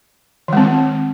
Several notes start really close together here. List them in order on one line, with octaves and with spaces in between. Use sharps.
D#3 G#3 C4